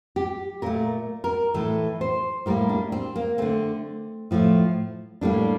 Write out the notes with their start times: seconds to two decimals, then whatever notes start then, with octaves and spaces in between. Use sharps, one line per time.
0.16 G4
0.62 A#2 A3 A#4
1.24 A#4
1.54 A2 E3 A3 A4
2.01 C5
2.46 A2 G3 A#3 A#4
2.69 D4
2.92 C4
3.16 A#3
3.38 D3 A3 C4
4.31 A2 F3 A3
5.21 A2 G3 A#3 D4